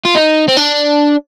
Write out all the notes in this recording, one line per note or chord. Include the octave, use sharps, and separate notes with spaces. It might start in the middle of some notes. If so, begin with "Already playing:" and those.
F4
D#4
C4
D4